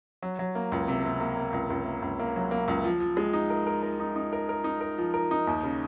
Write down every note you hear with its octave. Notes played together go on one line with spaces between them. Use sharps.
F#3
F#3
A#3
C#2
C3
C3
A#3
A#3
C#2
C#2
A#3
C#2
A#3
F#3
A#3
C#2
F3
F3
G#3
D#4
A#4
A#4
A#4
D#4
D#4
A#4
A#4
D#4
A#4
F3
A#4
D#4
D#2
C#3